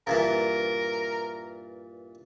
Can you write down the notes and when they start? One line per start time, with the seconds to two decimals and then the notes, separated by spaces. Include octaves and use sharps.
0.07 G2 A#2 E3 A#4